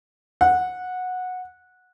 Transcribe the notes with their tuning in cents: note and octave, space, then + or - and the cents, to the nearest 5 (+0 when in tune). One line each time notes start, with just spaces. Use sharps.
F#5 -15